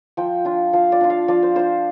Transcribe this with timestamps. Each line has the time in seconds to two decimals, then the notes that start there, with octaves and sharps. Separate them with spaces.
0.17 F3 G5
0.45 D4 F4
0.73 F3 F5
0.92 D5
1.01 D4 F4
1.10 F5
1.28 F3 D5
1.43 C5
1.55 D4 F4 C5